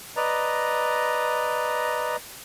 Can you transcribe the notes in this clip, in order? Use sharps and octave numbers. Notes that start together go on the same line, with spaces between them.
B4 D5 D#5 A#5